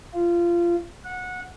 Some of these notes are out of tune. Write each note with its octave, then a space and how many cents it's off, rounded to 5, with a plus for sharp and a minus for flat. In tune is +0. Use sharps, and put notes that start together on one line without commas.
F4 -20
F#5 -20